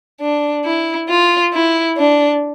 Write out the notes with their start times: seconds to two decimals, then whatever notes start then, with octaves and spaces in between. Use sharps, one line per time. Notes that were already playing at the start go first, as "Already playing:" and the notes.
0.21 D4
0.65 E4
1.09 F4
1.53 E4
1.97 D4